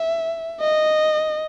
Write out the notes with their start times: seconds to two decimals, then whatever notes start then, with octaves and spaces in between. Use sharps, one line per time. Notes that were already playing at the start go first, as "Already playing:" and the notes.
Already playing: E5
0.61 D#5